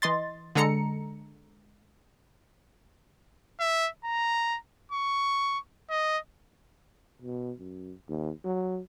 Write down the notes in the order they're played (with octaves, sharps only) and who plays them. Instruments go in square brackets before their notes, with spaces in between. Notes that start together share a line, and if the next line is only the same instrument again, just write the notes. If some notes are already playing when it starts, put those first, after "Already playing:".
[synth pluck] E3 D#5 C6 A6
D3 G#3 A4 A#5 C#7
[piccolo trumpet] E5
A#5
C#6
D#5
[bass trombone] B2
F#2
D#2
F#3